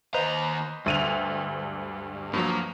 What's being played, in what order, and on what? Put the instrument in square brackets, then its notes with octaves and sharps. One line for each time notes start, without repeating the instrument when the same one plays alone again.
[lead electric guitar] D#2 A#5 [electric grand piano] B4 C5 D#5
[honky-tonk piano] D2 D#7 F7 [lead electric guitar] G2
[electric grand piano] G2 F3 F#3 [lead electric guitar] A#3